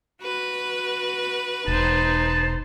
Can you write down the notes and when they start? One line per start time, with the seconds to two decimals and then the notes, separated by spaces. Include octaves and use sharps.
0.22 F#4 B4
1.68 E1 D#4 C5 A5